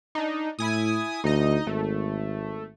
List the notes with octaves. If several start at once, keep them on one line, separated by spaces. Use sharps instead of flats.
D4 D#4
A2 E4 G#5 D#6
D2 D#4 D#5
G#1 A3